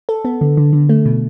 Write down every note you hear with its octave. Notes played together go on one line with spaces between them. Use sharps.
A4
B3
D3
D3
D3
A3
B2